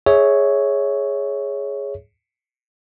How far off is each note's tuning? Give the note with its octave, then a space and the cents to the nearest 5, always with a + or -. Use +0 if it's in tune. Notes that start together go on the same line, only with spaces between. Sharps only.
G#4 +0 C#5 +5 E5 -15